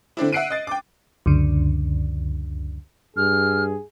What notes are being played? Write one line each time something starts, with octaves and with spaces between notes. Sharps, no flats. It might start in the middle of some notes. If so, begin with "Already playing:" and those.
D3 C4 D4 E4
E5 F#5 F#6 C7 D7 D#7
D#5 A6
G5 D6
C#2 F#2 D3
G2 G#4 F6